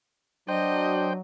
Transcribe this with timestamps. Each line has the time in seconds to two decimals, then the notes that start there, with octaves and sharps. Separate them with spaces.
0.49 F#3 D4 C5 D#5 G5